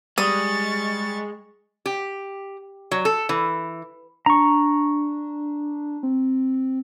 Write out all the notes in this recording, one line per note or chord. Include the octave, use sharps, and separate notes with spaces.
G3 G#3 C#6 D#6 A6
G4
F#3
A4
E3
D4 A#5 C#6
C4